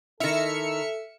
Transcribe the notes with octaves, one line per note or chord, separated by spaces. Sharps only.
D#3 E4 A4 E5 F6 C#7